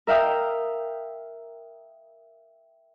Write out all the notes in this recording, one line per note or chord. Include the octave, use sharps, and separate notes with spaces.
A#4 E5 F5 G5 D#6